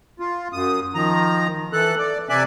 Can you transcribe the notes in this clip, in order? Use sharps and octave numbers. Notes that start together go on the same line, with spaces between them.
F4
F#2 D#6
D#3 F3 A#5
E3 A4 F#6
D5
C3 D5 E5 G#5 F#6